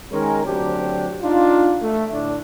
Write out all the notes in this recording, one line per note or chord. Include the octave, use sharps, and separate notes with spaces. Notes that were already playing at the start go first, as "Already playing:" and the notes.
D#3 G#3 C#4 A#4
D2 F#3 C4 D4 G4
D4 D#4 F4
A3
A2 D3 D4